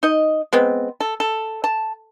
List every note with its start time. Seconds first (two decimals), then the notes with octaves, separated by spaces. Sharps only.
0.03 D#4 D#5
0.53 G#3 B3 C4
1.00 A4
1.20 A4
1.64 A5